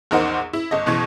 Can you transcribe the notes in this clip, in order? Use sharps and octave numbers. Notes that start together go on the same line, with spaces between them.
A#1 E2 D#4 A#4 C5 F#5
E4
G1 D#5
F#1 B2 E3 C#6 G#6